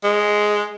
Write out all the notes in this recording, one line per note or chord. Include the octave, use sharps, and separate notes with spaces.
G#3